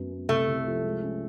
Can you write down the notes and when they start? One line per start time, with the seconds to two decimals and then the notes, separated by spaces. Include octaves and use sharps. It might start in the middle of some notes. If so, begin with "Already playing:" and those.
Already playing: F#2 F#3 B3
0.11 B3
0.29 C2 A3
0.47 C2
0.66 F3
0.84 G#3
1.03 C#4